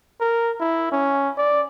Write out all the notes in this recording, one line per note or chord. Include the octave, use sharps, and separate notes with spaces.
A#4
E4
C#4
D5